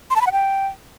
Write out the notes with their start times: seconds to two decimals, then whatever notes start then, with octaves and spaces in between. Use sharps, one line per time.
0.10 C6
0.16 A5
0.21 B5
0.27 F#5
0.32 G5